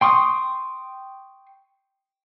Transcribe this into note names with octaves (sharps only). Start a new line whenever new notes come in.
G5 C6 C#6 D#6